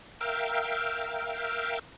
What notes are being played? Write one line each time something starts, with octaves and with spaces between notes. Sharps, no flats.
A#4 E5 F5 G5